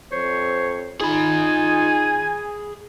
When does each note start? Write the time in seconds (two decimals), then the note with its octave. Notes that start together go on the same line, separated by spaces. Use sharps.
0.12 F2 C5 C#5
1.01 D#4 F4 G#4 G#5 B5